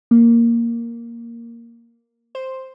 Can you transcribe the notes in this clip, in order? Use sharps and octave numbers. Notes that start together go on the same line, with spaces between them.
A#3
C5